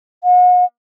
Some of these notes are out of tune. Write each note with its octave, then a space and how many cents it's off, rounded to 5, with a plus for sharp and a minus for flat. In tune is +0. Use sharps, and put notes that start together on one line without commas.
F#5 -40